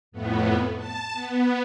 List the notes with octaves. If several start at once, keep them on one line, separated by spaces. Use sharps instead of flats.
F2 A2 B3
A5
B3